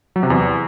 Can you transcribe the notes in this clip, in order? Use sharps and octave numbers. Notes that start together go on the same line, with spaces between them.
F#3
C3
E2